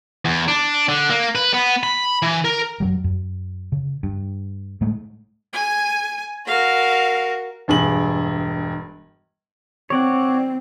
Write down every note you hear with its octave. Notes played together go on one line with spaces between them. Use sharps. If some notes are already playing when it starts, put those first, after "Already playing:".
E2
D4
D3
A#3
B4
B3
B5
E3
A#4
F#2 F#3 G3
F#2
C#3
G2
A2 G#3 A3
G#5
F#4 A#4 F5
E1 G2 G#4 F#7
C4 C#5 D5 F#5